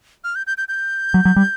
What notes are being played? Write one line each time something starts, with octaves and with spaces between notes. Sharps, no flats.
F6
G6
G6
G6
G6
F#3
F#3
G3